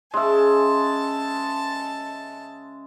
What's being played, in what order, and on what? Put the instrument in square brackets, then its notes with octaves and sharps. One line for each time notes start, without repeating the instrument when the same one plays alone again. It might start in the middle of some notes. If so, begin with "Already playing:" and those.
[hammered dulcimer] C#3 C#4 [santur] G#3 E5 [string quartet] A5